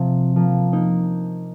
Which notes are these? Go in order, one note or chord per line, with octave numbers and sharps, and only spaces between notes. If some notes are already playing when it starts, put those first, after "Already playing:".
Already playing: C3 F3
F3 A#3
A#3 D#4